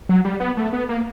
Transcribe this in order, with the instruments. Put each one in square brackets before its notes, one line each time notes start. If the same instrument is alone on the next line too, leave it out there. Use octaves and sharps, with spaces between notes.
[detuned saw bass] F#3
G3
B3
A3
B3
A#3